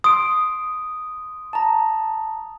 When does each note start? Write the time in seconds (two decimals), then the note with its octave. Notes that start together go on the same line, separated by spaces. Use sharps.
0.04 C6 D#6 D7
1.53 A5 A#5